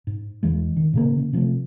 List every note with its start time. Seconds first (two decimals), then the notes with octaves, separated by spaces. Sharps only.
0.07 G#2
0.43 E2 E3 G#3
0.76 D#3
0.93 A2 C#3 A#3
1.18 C#3
1.33 C3 F3 G#3 A3